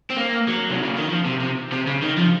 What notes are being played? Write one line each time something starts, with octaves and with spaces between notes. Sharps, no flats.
C4
A#3
F#3
C3
C#3
D#3
F3
C3
C3
C3
C#3
D#3
F3